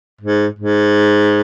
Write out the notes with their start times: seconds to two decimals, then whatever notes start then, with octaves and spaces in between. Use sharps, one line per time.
0.21 G#2
0.59 G#2